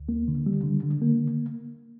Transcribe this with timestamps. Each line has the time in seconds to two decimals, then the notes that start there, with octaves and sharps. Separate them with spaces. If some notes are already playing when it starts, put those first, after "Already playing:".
Already playing: D2
0.09 A#3
0.28 D3
0.46 G3
0.64 D3
0.83 D3
1.02 A#3